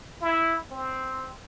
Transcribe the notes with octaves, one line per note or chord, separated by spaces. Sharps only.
E4
C4